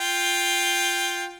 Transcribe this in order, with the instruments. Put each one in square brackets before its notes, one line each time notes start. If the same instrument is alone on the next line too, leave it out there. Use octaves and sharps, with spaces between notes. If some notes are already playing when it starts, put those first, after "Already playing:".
[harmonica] F4 G5